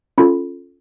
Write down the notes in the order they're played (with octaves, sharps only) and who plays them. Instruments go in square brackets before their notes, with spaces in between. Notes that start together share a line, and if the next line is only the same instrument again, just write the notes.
[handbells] C#4 F4 A4 B5